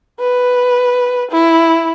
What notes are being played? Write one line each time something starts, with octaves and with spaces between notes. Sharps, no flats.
B4
E4